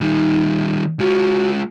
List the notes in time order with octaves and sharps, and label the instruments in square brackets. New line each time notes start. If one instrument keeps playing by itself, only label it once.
[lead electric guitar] D#3 G3 [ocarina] D#4
[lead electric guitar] G#3 F4 [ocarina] F#4